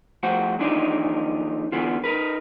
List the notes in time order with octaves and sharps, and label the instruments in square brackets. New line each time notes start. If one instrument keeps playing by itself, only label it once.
[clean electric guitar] F3 A3 F#4 C5 F#5
D#2 E3 F3 D4 D#4
D3 E3 B3 F4
D#4 A#4 B4